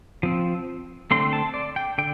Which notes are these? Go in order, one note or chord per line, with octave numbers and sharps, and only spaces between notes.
F3 C4
D3 A3 C4 C6
A5
D5
G5
D3 G5